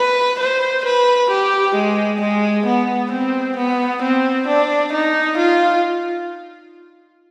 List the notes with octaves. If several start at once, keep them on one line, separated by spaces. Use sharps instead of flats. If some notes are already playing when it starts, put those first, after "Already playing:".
Already playing: B4
C5
B4
G4
G#3
G#3
B3
C4
B3
C4
D4
D#4
F4